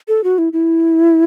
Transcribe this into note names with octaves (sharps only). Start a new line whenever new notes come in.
A4
F#4
E4
E4